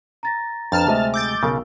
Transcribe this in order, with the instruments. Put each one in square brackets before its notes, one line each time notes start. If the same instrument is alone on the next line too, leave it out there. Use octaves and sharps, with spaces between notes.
[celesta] A#5 A6 A#6
[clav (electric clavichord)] F2 [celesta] D4 B4 A#5 [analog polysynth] A5 F6 A6
[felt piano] D2 G#3 D#5 [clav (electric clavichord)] C3 [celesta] C5 E5
[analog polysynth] D6 G6 A6 [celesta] E6
[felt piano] B1 A#4 [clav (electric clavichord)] C#3